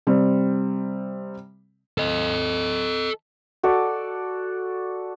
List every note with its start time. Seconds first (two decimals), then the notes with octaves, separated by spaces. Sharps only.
0.07 C3 G3 C4
1.98 A4 D#5
3.63 F#4 A4 D5